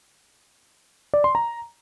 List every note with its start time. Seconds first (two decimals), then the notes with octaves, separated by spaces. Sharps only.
1.14 D5
1.24 C6
1.35 A#5